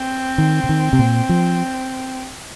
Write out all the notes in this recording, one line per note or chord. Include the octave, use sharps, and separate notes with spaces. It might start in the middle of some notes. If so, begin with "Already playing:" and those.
Already playing: C4
D#3
C3
D#3
C3
A#2
F3